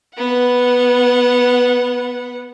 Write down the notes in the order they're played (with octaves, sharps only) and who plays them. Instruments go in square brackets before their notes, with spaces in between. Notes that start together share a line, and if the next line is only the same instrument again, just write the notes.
[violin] B3 F#5